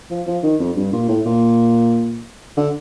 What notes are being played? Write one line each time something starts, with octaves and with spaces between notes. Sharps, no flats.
F3
F3
D#3
F2
G2
A#2
A2
A#2
D3